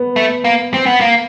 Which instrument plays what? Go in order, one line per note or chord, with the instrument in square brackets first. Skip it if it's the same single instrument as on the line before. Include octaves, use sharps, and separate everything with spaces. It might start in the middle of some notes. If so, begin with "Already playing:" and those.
Already playing: [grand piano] B3
[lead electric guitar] A3
A#3
C4
B3
A#3